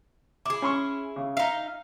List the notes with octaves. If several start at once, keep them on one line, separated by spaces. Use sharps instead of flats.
E4 G#4 D6
C#4 C6 C#6
C#3
D#4 E5 F5